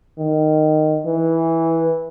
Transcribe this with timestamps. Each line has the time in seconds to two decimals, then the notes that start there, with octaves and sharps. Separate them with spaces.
0.18 D#3
1.06 E3